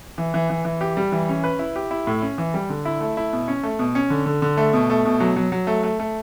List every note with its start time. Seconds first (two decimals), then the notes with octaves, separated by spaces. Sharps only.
0.18 E3
0.34 E3
0.50 E3
0.65 E3
0.81 G4
0.97 G3
1.12 E3
1.29 C#4
1.44 B4
1.59 E4
1.76 G4
1.91 E4
2.07 A2
2.22 C#4
2.38 E3
2.54 G3
2.70 D3
2.85 E4
3.01 A3
3.17 E4
3.33 B2
3.48 C#4
3.63 A3
3.79 B2
3.95 C#4
4.10 D3
4.26 D3
4.42 D3
4.57 A3
4.73 B2
4.90 A3
5.05 B2
5.20 F#3
5.36 F#3
5.52 F#3
5.67 A3
5.83 A3
6.00 A3